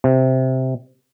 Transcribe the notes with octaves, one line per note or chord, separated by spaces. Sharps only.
C3